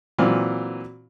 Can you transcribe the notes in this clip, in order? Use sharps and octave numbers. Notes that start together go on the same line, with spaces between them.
A#2 E3 F#3 C4 F4